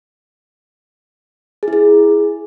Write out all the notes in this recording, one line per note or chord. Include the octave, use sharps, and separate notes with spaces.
G#4
E4
G#4